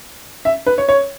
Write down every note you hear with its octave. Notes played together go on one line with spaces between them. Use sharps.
E5
B4
C#5
C#5